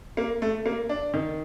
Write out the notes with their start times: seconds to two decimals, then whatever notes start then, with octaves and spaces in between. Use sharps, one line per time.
0.17 A#3
0.42 A3
0.66 A#3
0.89 D4
1.14 D#3